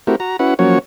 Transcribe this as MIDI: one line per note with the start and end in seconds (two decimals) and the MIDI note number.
0.07 0.16 57
0.07 0.16 60
0.07 0.16 64
0.07 0.16 66
0.07 0.16 67
0.07 0.16 70
0.20 0.37 66
0.20 0.37 82
0.39 0.54 61
0.39 0.54 64
0.39 0.54 66
0.39 0.54 71
0.39 0.54 78
0.59 0.79 53
0.59 0.79 54
0.59 0.79 58
0.59 0.79 61
0.59 0.79 66
0.59 0.79 73